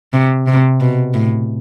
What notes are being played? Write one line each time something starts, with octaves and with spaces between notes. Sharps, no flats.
C3
C3
B2
A2